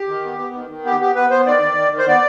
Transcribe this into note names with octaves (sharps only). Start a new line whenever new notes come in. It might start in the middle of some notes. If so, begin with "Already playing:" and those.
Already playing: G4
D#3
B3
B3
D#3
D#3
B3 G4
B3 G4
B3 B4
B3 C5
D#3 D5
D#3
D#3
D#3
C5
B3 D5